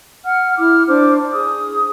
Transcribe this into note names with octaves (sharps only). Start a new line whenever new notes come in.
F#5 F6
E4 D6 F6
D4 C5 D6
G#4 D#6